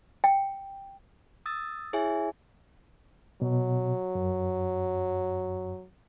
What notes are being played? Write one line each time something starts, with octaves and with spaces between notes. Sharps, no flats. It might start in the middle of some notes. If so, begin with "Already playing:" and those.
G5
D#6 E6 A6
E4 G#4 C#5 E5 G#5
B2 F#3
F#2